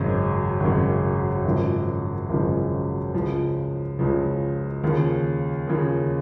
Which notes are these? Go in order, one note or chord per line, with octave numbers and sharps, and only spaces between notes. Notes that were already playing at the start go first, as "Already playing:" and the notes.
Already playing: G#1 F#2 C#3
G#1 F#2 C#3
G#1 F#2 C#3 F3
G#1 F#2 C#3 F3
C#2 C#3 F3
C#2 C#3 F3
D#2 C#3 F3
D#2 C#3 F3